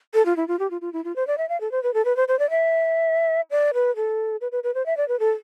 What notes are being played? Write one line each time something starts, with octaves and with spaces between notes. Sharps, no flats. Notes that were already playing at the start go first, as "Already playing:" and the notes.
A4
F4
E4
F4
G4
F4
F4
E4
F4
C5
D5
E5
F5
A4
C5
B4
A4
B4
C5
C5
D5
E5
D5
B4
A4
B4
B4
B4
C5
E5
D5
B4
A4